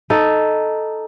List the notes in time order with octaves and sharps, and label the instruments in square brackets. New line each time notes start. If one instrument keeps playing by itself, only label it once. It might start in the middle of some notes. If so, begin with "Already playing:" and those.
[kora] D#4 A4